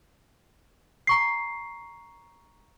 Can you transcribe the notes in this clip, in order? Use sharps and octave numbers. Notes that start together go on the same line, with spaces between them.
A#5 C#6 C7